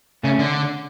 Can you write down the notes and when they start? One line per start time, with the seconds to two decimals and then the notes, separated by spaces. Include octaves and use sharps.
0.24 C#3 A3 C#4
0.39 D3